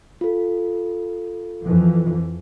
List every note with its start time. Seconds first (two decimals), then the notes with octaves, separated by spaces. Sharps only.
0.21 F4 A4
1.65 F2 E3 F3